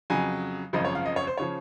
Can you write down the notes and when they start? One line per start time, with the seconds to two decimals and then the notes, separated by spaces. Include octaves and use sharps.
0.10 F2 C#3 F#3 G#5
0.73 G#1 F#2 C#3 F3 D#5
0.85 C#5
0.95 F5
1.06 D#5
1.16 C#5
1.27 C5
1.37 C#3 F3 C#5